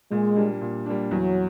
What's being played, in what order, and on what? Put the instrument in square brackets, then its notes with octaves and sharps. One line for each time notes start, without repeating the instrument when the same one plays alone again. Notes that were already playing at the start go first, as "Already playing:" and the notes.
[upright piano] A#2 [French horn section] G#3
[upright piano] G3 A#3 D4
A#2
G3 A#3 D4
[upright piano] E2 [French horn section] F#3